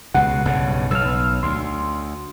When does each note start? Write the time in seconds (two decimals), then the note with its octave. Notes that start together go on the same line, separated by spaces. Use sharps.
0.14 C#2 B2 F#5
0.45 B1 G2 C#3
0.91 B1 E6 F6
1.43 D2 C6